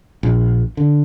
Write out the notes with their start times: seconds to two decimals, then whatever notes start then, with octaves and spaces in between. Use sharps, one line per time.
0.23 A#1
0.77 D3